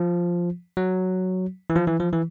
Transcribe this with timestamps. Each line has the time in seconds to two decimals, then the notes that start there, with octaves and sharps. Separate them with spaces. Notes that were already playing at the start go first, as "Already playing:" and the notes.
Already playing: F3
0.77 F#3
1.70 E3
1.75 F3
1.87 E3
2.00 F3
2.13 E3